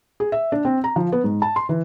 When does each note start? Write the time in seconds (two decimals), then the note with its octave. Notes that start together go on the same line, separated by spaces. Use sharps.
0.20 G#4
0.32 E5
0.52 D4
0.65 C4
0.84 A#5
0.96 F3
1.12 B3
1.24 G#2
1.42 A5
1.56 C6
1.69 E3